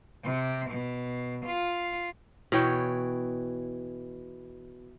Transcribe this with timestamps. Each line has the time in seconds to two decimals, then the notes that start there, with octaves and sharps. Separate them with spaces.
0.23 C3
0.71 B2
1.45 F4
2.52 B2 E3 C#5 G5